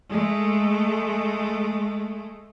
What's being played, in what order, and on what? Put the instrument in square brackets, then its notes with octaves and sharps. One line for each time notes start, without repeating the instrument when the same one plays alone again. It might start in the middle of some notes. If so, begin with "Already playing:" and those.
[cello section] G#3 A3